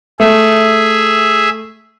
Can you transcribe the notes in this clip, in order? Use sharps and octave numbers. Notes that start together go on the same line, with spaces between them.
A3 G#4 E5